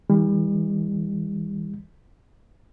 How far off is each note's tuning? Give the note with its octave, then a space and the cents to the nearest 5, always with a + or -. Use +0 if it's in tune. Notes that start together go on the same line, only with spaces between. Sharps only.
E3 -35 G3 +40